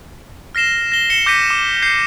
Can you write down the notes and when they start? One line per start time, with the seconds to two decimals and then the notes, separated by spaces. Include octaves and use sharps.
0.55 F6 A#6 C7 E7 G7
0.92 A#6 G7
1.10 C#7 E7 G7
1.26 D6 G6 A#6 B6 D#7
1.51 D6
1.82 G6 C7 C#7